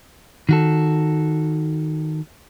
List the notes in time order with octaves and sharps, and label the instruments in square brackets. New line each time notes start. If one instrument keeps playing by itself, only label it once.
[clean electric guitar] D#3 F#4 A4